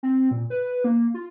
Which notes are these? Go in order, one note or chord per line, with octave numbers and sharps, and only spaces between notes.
C4
A#2
B4
A#3
F4